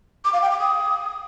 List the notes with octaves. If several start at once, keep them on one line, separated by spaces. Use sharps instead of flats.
D6
F5
G5
D6
D#6